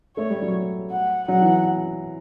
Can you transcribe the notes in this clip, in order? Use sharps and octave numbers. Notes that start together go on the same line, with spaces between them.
A3 C#5
G3
F#3
F#5
F#3 F#5
E3